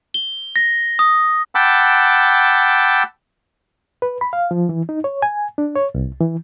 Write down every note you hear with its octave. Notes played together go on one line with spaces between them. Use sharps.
G7
A#6
D#6
F#5 G5 A5 B5 D6 E6
B4
B5
F5
F3
E3
D#4
C#5
G#5
D4
C#5
C2
E3